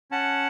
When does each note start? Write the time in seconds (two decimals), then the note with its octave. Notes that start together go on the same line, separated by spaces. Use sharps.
0.11 C#4 F#5 A5